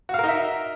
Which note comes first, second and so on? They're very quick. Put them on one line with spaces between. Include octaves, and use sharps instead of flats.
F#4 F5 A#4 D#4 E5